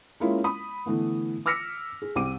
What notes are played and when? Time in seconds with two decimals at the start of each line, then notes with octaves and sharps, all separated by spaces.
0.20 G#3 A#3 C#4 E4 F4
0.44 B5 D#6
0.86 D3 E3 A3 B3
1.46 D6 E6 F6 A#6 B6 C#7
2.02 G#4
2.15 C2 C4 D6 D#7